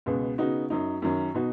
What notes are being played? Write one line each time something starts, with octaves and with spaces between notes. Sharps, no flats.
C#2 B2 G#3 B3
C#3 B3 D#4 F#4
F#2 F#3 D#4
F#2 D#3 F#3 C#4
B2 B3 D#4 F#4